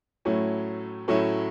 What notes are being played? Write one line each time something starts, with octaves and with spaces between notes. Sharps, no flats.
A2 F#3 A3 C#4 E4
A2 F#3 A3 C#4 E4